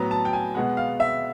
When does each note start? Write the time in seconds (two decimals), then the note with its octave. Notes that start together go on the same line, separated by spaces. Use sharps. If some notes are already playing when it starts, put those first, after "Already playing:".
Already playing: A2 F#3 B3 A#5
0.11 A5
0.25 G5
0.33 G#5
0.54 B2 G#3 B3 F#5
0.77 F5
1.00 E5